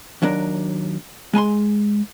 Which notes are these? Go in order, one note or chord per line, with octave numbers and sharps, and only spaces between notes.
D#2 F#3 D4 A#4
G#3 G#5 A#5 C6